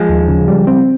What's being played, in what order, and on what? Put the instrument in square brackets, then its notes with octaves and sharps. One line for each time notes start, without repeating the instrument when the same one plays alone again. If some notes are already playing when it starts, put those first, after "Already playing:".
Already playing: [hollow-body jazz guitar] F3 G#3
[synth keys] D#2
C#3
G3
C4